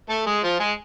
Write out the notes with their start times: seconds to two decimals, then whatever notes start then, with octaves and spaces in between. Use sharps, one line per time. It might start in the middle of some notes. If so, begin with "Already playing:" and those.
0.09 A3 A4
0.26 G#3 G#4
0.43 F3 F4
0.60 G#3 G#4